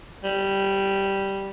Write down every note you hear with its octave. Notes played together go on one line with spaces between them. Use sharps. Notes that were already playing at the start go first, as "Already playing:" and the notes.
G3